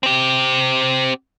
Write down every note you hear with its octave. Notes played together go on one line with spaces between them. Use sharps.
C4 G4